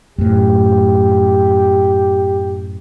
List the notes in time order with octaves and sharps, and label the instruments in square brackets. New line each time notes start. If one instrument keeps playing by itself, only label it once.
[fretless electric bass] F#2 A2 [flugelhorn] G4